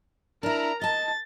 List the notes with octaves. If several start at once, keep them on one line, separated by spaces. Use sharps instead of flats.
D4 E4 A#4 A#5
D#5 A5 A6